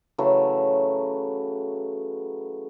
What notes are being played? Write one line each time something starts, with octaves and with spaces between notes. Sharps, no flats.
C#3 E3 F#3 A3